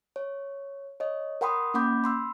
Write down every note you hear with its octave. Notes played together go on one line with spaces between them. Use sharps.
C#5
C#5 D#5
A#4 F#5 G5 B5 C6 D#6
A#3 C#4 F#5 B5 D6 G6
B5 C6 E6